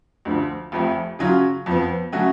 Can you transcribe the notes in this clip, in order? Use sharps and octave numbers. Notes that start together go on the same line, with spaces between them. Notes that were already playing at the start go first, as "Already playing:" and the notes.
D2 D3 F3
F1 F2 F3 A3
C#3 F#3 C#4 F4
F2 F3 B3
C#3 F#3 A3 C#4 F#4